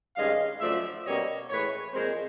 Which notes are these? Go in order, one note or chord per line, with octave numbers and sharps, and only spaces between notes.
G2 D#3 G#3 C#4 D#5 F5
F#2 D3 F3 A3 D5 E5
B2 G3 A#3 C#4 C#5 D#5
A2 E3 G#3 B4 C#5
A#2 F3 G#3 C4 A#4 C5